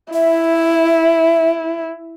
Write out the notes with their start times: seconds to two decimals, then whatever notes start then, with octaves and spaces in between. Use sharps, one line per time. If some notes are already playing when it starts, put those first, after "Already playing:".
0.13 E4 E5